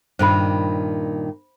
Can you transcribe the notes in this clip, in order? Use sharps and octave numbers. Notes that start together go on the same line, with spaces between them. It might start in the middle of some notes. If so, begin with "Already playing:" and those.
G2 A#2 D#3 C5 B5